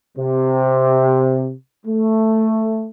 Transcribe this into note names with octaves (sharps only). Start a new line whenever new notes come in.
C3
A3